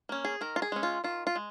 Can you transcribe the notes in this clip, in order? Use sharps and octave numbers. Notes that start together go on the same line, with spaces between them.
A#3 C#4
G#4
D#3 A#4
F4
G#4
G#3 C#4
F4
D#3 F4
F4
G#3